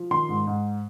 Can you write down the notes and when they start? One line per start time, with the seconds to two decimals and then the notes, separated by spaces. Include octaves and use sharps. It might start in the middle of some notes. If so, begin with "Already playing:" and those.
Already playing: F3
0.11 D#3 C6
0.29 G#2
0.47 G#2